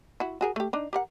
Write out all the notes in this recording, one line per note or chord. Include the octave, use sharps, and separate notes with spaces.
E4 F#4
F#4 G#4 A#4
A3 G4
D4 D#4
G4 A#4 F#5